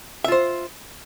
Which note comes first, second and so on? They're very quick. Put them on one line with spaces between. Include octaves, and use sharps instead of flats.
E5 F4 C5